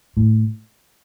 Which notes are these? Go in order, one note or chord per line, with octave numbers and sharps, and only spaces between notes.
A2